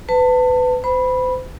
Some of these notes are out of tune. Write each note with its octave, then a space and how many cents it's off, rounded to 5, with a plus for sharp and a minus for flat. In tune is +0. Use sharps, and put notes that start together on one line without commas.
B4 +25 A5 +30
C5 -35 B5 -10